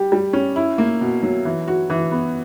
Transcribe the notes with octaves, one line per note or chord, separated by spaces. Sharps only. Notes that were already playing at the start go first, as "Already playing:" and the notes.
Already playing: G3 G4
G3
C#4
E4
A#3
B2
F#3
E3
F#4
E3
B3